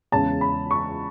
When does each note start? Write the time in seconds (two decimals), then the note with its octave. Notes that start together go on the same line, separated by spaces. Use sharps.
0.12 E2 C#3 G#3 C#4 A5
0.41 B5
0.71 C#6